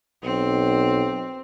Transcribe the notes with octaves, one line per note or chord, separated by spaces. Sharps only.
B1 C4